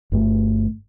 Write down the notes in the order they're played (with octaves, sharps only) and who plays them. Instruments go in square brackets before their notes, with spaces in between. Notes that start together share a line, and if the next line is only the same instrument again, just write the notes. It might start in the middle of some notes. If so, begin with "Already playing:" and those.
[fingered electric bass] G1 G2 A3